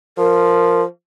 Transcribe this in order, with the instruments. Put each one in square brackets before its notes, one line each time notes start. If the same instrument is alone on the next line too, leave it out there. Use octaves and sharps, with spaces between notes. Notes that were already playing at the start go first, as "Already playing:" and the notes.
[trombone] F3 [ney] A#4